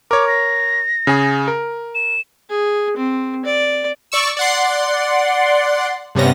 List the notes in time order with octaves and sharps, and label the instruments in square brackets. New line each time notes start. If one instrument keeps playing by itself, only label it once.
[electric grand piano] A#4 C#5 [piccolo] D6
[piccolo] A#6
[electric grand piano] C#3 G#4
A#4
[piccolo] E7
[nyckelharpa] G#4
C4
D5
[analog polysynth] D5 C#6 E6
D5 F#5 C6
G2 C3 G3 B3 C#4 A#6